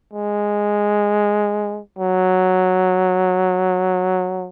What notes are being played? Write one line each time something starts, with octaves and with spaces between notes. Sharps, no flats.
G#3
F#3